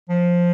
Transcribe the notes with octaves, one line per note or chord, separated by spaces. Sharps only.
F3